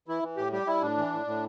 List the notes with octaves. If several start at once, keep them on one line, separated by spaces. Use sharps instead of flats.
E3 E4
E3
A2 G4
G3 G4
G3 E4
A2 D4
E3
A2
A2